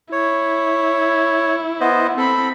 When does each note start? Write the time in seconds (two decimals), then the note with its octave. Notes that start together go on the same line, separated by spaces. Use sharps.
0.12 E4 C#5
1.81 B3 C5 D#5
2.18 C4 A4 B5